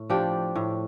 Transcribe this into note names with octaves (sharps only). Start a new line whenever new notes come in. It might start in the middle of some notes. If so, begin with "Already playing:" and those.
Already playing: A2
F3 D4 G4
A2